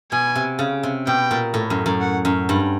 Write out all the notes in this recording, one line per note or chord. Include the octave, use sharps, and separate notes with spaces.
B2 G#5
C3
C#3
C3
B2 G5
A#2
A2
F#2
F#2
F#5
F#2
G2